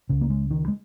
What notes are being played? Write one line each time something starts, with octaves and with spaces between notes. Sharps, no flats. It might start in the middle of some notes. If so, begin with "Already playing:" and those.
C#2 C#3
A#3
G#3
D#3
G#3